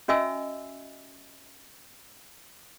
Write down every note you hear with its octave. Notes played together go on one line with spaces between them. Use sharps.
C#4 F#4 D#5 E5 G#5 E6